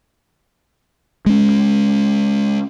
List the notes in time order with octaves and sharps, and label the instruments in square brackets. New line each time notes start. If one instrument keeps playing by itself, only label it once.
[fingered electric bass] G#3 C#4